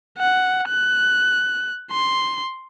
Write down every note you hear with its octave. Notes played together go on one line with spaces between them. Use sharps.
F#5
F#6
C6